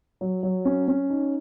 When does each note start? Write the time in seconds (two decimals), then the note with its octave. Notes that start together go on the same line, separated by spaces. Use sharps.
0.21 F#3
0.43 F#3
0.65 C#4
0.88 C#4
1.10 D#4